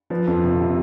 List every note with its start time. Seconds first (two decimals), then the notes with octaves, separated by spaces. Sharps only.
0.10 F3 B4
0.27 F2
0.44 F1
0.60 C3